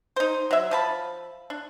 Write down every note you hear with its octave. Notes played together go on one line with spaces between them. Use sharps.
D#4 C5
F#3 E5
F3 A5 B5
D4